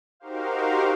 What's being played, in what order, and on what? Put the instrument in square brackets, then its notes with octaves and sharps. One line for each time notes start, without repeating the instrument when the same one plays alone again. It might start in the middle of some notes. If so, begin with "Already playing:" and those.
[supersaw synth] D#4 F#4 G4 A#4 C5 F5